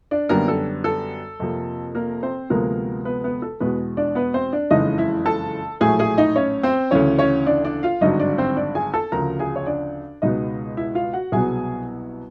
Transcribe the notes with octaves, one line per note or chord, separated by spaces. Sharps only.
D4 D5
F#2 D3 G3 A#3 B3 A#4
A4
A4
F2 C3 F3 A#3
A#3 A#4
C4 C5
D2 C3 F3 G#3 A#3 B3 A#4
B3 B4
B3 B4
A4
E2 B2 G#3 B3 B4
D4 D5
B3 B4
C4 C5
D4 D5
F#1 F2 C#3 E3 G#3 D#4 D#5
E4 E5
A4 A5
A#1 A2 F#3 A3 G#4 G#5
G#4 G#5
D#4 D#5
C#4 C#5
C4 C5
D2 C#3 E3 C#4 C#5
C#4 C#5
D4 D5
D4 D5
F4 F5
G#1 G2 D3 F#3 D#4 D#5
D4 D5
C4 C5
D4 D5
G#4 G#5
A4 A5
D2 C#3 F3 A#4 A#5
G#4 G#5
C#5
D4 D5
C#2 B2 G#3 B3 D#4 D#5
E4 E5
F4 F5
F#4 F#5
C2 B2 F#3 B3 G#4 G#5